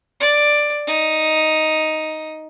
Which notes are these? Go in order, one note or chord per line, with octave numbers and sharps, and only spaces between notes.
D5
D#4